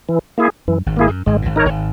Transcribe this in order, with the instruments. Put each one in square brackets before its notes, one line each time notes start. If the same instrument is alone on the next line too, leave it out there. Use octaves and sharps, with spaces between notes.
[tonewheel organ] E3
A#3 E4 G#4
[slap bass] F#2 [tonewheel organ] E3
[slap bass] G#1 G#2
[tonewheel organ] A#3 E4 G#4
[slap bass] F#2
[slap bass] G#1 G#2 [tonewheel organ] G#3
[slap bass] A#2
G#1 G#2
[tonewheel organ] D#4 A#4 C#5
[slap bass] G#1 G#2